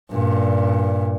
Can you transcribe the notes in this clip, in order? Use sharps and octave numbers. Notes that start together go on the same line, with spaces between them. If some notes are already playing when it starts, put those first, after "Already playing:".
G2 A#2